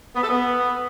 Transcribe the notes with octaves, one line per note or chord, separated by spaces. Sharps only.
B3
A4
B3